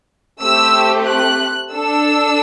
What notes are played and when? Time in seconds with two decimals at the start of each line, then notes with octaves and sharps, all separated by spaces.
0.41 A3 C4 G4 E6
1.08 F#6
1.73 D4 A4 E6